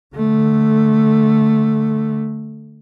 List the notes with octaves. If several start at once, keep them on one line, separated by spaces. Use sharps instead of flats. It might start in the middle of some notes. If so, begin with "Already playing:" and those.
D3 A3